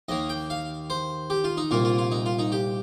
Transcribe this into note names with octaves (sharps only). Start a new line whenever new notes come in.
D#2 D#3 A#3 D#5
G5
F5
C5
G4
F4
D#4
C2 A#2 A#3 F4
F4
F4
D#4
F4
D#4
G4